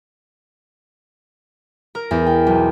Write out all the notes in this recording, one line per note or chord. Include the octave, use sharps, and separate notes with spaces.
A#4
E2
G5
B1